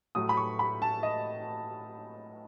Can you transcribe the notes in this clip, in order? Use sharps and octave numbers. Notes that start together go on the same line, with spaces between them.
A2 F#3 A3 D#6
B5
C#6
B5
A5
D#5